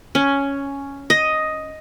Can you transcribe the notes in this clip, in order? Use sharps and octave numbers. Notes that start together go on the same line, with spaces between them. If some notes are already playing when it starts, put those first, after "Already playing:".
C#4
D#5